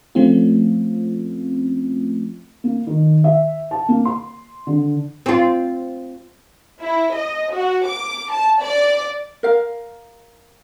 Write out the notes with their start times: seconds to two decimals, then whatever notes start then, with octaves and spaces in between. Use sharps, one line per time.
0.15 F3 A3 C4 C#4 F4
2.64 A#3
2.87 D#3
3.24 E5
3.71 A5
3.88 A#3
4.05 C6
4.67 D3
5.26 C4 F4
6.81 E4
7.14 D#5
7.52 F#4
7.86 D6
8.31 A5
8.60 D5
9.43 A#4 F5